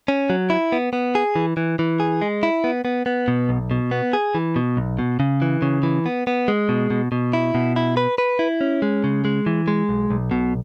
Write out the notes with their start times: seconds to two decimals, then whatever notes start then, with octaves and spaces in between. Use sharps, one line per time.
0.08 C#4
0.30 F#3
0.50 E4
0.72 B3
0.93 B3
1.15 G#4
1.36 E3
1.57 E3
1.79 E3
2.00 G#4
2.22 G#3
2.43 E4
2.64 B3
2.85 B3
3.06 B3
3.28 B2
3.49 B1
3.71 B2
3.91 B3
4.13 G#4
4.35 E3
4.56 B2
4.77 B1
4.99 B2
5.20 C#3
5.42 E3
5.62 C#3
5.83 E3
6.06 B3
6.27 B3
6.48 G#3
6.69 B2
6.90 B2
7.12 B2
7.33 E4
7.55 B2
7.76 E4
7.97 B4
8.18 B4
8.39 E4
8.61 C#4
8.82 G#3
9.04 C#3
9.25 G#3
9.46 E3
9.68 G#3
9.89 B1
10.10 B1
10.31 B2